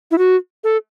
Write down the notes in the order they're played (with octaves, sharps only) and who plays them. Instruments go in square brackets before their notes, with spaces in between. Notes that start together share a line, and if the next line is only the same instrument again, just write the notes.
[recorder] E4
F#4
A4